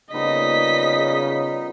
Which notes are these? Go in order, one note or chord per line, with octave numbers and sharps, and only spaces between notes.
A#2 C#3 G3 B3 D#4 D#5 B6